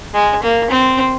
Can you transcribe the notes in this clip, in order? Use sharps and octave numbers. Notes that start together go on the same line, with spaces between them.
G#3
A#3
C4